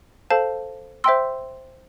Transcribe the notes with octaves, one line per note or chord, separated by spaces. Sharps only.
A4 C5 F5 A5
C5 E5 G5 C6 E6